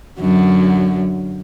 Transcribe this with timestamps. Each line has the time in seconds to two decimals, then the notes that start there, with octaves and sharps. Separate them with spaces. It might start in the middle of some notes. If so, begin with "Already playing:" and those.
0.19 F#2 D3 F#3